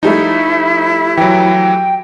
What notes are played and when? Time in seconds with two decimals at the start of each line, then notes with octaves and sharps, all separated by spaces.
0.03 F3 G3 A3 D#4 E4
1.17 E3 F#3 G5